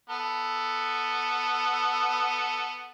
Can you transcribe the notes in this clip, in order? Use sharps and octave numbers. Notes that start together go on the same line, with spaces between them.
B3 A4